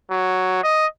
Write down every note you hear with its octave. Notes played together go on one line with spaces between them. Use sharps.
F#3
D#5